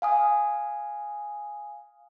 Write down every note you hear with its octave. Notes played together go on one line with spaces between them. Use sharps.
F5 G#5 D#6